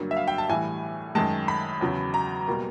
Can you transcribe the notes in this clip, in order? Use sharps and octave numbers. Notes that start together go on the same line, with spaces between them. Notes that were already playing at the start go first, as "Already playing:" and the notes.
Already playing: G2 D3 F#3 A#3
E5
F5
G5
A5
A2 E3 G3 G#5
F#2 D#3 G#3 A5
B5
E2 C#3 F#3
A#5
B2 G3 A#3